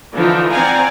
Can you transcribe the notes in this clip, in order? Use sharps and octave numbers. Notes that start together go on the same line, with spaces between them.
D3 E3 F3 D4 D#4
C4 D5 F5 F#5 G#5 A#5